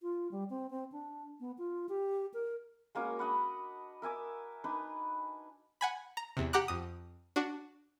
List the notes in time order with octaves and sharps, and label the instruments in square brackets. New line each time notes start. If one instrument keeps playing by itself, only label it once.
[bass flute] F4
G3
C4
C4
D4
B3
F4
G4
A#4
[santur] G#3 A#3 C#4 F#4
D4 D#5 F#5 B5
A#4 E5 G#5 D6
D4 D#4 B4
[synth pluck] F#5 G#5 B5
A#5
E2 C3
G4 F#5 A#5 D6 F#6
F2 D#6
D4 F#4